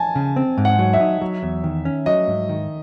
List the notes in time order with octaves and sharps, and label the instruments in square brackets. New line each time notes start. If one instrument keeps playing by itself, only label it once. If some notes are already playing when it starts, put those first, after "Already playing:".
Already playing: [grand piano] G#5 A5
[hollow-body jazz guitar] C#3
C4
G#2
[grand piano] F#5
[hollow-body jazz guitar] F#3
[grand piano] E5
[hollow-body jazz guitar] D#4
F#3
E2
D#3
C#4
[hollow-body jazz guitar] F#3 [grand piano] D#5
[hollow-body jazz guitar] G#2
D#3